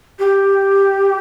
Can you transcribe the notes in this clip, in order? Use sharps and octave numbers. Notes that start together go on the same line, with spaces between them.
G4